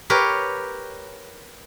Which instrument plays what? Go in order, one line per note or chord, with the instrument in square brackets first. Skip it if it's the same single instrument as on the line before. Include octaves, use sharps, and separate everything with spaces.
[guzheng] G4 A#4 B4 C#5